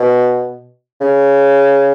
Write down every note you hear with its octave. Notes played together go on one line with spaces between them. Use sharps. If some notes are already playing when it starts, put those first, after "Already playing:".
Already playing: B2
C#3